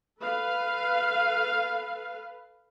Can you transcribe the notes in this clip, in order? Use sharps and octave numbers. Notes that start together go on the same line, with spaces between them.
A4 B4 F5